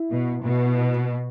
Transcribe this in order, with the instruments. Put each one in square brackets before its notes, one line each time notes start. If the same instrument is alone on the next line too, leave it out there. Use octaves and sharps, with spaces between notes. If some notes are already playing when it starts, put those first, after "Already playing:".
Already playing: [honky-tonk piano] E4
[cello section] B2
B2